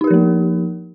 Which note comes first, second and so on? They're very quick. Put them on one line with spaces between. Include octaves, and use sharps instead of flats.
D#4 G4 A#4 F3 A#3